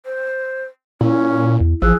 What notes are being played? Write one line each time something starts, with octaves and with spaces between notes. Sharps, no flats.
C5
A#2 C#4 E4
E2
A1 F3 G#4 E6 F#6